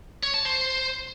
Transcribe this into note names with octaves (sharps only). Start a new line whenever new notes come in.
C#5
A5
C5